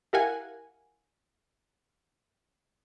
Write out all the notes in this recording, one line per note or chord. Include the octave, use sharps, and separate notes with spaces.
E4 G4 A#4 F5 F#5 G#5